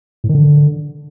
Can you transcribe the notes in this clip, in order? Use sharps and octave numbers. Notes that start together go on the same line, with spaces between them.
A2
D#3
D3